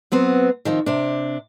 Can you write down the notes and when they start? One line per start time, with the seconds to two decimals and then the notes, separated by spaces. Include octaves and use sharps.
0.12 F#3 B3 C4
0.65 D#3 F3 C4
0.86 C3 D4